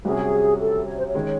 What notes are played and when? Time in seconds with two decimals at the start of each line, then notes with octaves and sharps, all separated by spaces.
0.04 C2 C3 F#3 C#4 G#4
0.60 A4
0.87 C#5
0.98 C5
1.08 C#5
1.15 D#3 G#3 C#4